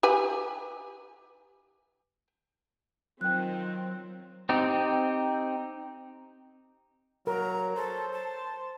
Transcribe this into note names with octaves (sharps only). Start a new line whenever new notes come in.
G4 B4 G#5
D#3 F#3 C4 F4 G5 F#6
C4 D#4 G4
F#3 A#4 A#5
A4 C5
A5